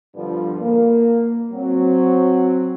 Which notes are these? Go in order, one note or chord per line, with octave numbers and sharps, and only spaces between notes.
G2 D3 F3 G3 B3 F4
A#3
F#3 C4